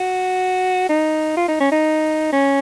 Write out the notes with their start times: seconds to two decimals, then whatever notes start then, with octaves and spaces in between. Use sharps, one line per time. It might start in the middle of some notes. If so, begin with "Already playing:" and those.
Already playing: F#4
0.89 D#4
1.37 F4
1.48 D#4
1.60 C#4
1.72 D#4
2.33 C#4